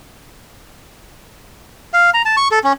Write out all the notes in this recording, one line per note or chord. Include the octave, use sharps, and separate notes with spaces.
F5
A#5
A5
C#6
A4
C#4